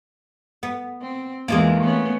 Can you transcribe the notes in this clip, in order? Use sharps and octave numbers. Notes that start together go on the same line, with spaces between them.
B3
C4
E2 G#3 A#3 F4 G#4
A3 B3 C#4